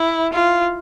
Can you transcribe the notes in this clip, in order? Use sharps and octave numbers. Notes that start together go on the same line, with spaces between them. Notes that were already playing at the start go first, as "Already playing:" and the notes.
Already playing: E4
F4